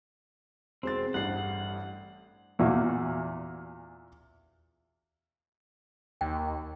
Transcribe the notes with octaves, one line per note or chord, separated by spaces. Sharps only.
E1 C4 C5 A6
A1 G2 F#5 C7
E2 A#2 F#4
D#2 G5